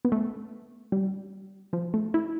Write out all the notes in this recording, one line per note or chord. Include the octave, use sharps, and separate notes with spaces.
B3
A3
G3
F3
A3
E4